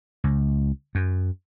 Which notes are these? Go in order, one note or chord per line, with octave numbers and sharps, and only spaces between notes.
C#2
F#2